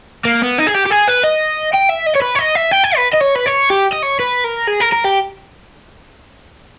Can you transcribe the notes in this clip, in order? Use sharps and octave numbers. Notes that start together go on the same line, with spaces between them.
A#3
B3
D#4
G#4
G4
G4
G#4
B4
D#5
G5
E5
D#5
C#5
B4
C#5
D#5
E5
G5
G#5
B4
D#5
C#5
B4
C#5
G4
D#5
C#5
B4
A#4
G#4
A#4
A#4
G4